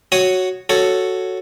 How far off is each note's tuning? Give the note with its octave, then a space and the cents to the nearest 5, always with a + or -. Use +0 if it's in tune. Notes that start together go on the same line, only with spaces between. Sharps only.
F#4 +0 C#5 +0 D#6 +0
F#4 +0 A4 +0 C#5 +0